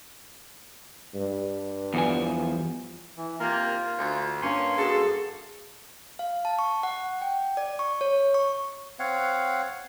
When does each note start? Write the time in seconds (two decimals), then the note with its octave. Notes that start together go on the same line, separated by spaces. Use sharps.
1.15 G2
1.94 E2 F3 G#5
3.17 E3
3.40 C3 D#3 A#3 F4
3.98 D2
4.41 G2 A#3 C#4 C6
4.78 F#4 G#4 A4
6.19 F5
6.45 A5
6.59 C#6
6.83 F#5
7.22 G5
7.57 D5
7.79 C#6
8.01 C#5
8.34 C#6
8.99 C4 C#5 F5 F#5